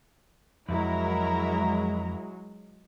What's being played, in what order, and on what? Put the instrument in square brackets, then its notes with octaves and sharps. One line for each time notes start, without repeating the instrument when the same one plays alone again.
[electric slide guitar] F2 [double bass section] F#3 G#3 [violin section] E4 A#4 A#5